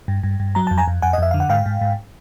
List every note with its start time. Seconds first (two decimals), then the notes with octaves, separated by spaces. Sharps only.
0.08 G2
0.23 G2
0.40 G2
0.55 F#3 A#5
0.67 F2 A5
0.78 G#5 A#5
0.88 F2
1.02 F2 F#5 G#5
1.13 D#5
1.18 F2 E5
1.31 D3 F5
1.40 F#5
1.49 G#2 F5 G5
1.66 G#2
1.81 G#2